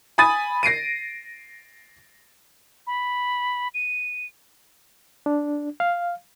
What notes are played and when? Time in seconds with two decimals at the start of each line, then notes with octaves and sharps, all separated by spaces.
0.18 G#5 B5 D#6 A6 D#7
0.63 A#6 C7 D7 D#7
2.87 B5
3.74 D#7
5.26 D4
5.80 F5